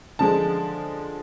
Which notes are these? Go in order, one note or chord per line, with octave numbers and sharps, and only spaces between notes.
D3 F3 G#3 A5